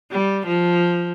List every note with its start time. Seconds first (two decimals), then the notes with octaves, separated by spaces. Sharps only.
0.12 G3
0.47 F3